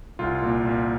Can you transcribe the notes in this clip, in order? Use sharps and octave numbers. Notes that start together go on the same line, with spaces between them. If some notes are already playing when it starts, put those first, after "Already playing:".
C2 F4
A#2
A#2